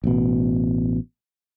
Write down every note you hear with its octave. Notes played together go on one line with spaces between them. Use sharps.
A1 B2